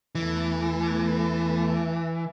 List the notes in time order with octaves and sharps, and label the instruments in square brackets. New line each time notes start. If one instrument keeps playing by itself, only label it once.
[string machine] E2 A3 A5 [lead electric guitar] E3